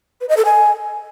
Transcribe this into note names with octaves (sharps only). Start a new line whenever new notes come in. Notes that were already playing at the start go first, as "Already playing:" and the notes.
B4
D#5
A4
G#5